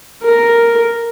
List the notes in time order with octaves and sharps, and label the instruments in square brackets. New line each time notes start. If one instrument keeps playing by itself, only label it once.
[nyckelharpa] A#4